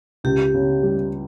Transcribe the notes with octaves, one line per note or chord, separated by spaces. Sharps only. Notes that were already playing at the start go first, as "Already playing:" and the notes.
C#2 G4
C#3
G3